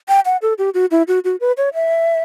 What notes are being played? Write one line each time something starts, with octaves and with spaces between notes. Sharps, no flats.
G5
F#5
A4
G4
F#4
E4
F#4
F#4
B4
C#5
E5